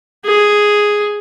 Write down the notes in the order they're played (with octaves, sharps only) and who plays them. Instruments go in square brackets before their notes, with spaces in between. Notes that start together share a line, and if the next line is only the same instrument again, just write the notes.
[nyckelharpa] G#4